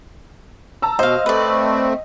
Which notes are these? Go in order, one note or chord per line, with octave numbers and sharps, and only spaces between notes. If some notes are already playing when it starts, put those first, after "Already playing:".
A5 A#5 E6
B2 C5 D#5 F5
A3 C4 B4 D5